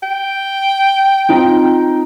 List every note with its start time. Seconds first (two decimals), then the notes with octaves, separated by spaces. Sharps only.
0.03 G5
1.29 C4 D#4 F4